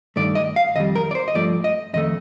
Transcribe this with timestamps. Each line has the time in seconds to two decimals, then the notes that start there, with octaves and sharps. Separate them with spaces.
0.16 G2 D#3 A3 D5
0.35 D#5
0.56 F5
0.75 F2 D#3 G3 D#5
0.95 A#4
1.11 D5
1.15 C5
1.28 D#5
1.34 G2 F3 A3 D5
1.64 D#5
1.93 F2 D#3 A3 D#5